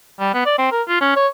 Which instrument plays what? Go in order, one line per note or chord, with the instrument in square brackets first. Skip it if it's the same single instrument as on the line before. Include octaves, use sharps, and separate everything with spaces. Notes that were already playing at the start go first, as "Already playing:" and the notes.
[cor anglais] G3
B3
D5
C4
A#4
F4
C#4
C#5